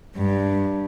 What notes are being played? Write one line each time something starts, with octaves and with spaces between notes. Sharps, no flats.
G2